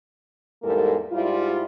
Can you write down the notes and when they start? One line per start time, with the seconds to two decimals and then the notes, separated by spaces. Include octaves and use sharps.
0.62 E2 G#2 G3 A#3 A4 A#4
1.12 G#2 G3 E4 F4